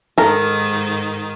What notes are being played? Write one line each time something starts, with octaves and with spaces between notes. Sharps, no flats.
G#2 D#3 A4 A#4